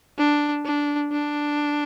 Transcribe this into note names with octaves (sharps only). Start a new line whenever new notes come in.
D4
D4
D4